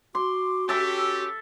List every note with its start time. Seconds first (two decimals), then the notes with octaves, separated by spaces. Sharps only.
0.15 F#4 C6 D6
0.69 C#4 G4 A4 E5 A5 E6